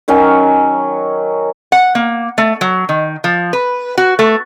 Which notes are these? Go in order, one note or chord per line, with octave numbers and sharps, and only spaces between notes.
D#3 F#3 C#4
F#5
A#3
A3
F#3
D#3
F3
B4
F#4
A3